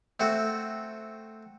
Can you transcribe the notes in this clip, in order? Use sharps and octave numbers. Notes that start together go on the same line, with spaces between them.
A3 C4 F#4